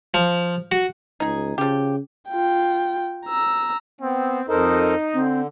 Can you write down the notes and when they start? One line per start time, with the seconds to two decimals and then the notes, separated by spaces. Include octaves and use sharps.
0.14 F3
0.72 F#4
1.20 C#2 D#4 G#4
1.58 C#3 F3 G4
2.29 F4 G5
3.26 A#5 E6
4.01 B3 C4
4.49 F2 D#4 A4 A#4 C5
5.14 D3 C4